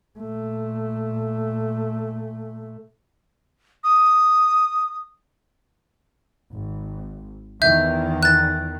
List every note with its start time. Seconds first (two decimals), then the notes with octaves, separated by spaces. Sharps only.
0.20 A#2 A3
3.84 D#6
6.53 G#1
7.62 E2 D#3 E3 E5 G6
8.23 F#6 A6